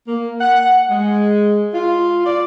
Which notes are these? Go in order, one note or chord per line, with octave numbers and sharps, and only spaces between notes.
A#3
F#5
G#3
F4
D5